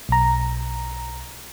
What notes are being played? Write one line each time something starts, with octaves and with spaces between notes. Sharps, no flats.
B1 A#5